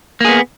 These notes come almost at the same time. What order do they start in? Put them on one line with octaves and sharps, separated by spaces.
A#3 G#4 B3